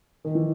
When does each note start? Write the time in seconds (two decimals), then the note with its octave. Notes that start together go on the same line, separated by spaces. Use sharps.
0.25 D#3
0.35 E3